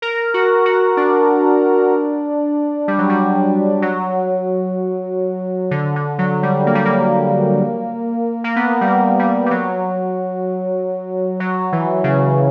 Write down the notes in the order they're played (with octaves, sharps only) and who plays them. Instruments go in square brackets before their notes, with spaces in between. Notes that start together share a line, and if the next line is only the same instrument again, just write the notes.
[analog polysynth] A#4
F#4
F#4
D4
G3
F#3
G3
F#3
D3
D3
F#3
G3
A#3
G3
A#3
A#3
B3
G3
A#3
G3
G3
F#3
F#3
E3
C#3